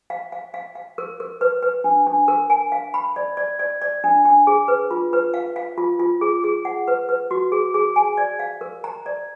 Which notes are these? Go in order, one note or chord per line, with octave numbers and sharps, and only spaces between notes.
F5
F5
F5
F5
A#4
A#4
B4
B4
D4
D4
A#4
G#5
F5
B5
D5
D5
D5
D5
D4
D4
G#4
B4
F4
B4
F5
F5
F4
F4
G#4
G#4
F#5
B4
B4
F#4
G#4
G#4
G#5
D5
F5
A#4
A#5
D5